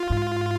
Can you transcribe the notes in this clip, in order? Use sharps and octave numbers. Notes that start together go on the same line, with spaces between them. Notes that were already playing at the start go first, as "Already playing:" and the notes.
Already playing: F4
G#2